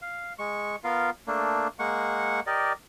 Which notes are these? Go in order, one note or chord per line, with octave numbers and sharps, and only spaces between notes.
F5
G#3 C#6
B3 F4 A#4 F5
A3 A#3 D4
G#3 A#3 F#5 C#6
G4 A#4 D5 D#5